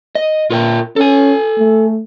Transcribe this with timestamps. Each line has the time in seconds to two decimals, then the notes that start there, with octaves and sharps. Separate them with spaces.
0.15 D#5
0.50 A#2 F4 A#4 G5
0.96 C#4 A4 G#5
1.58 A3